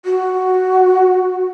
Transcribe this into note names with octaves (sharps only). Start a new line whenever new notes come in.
F#4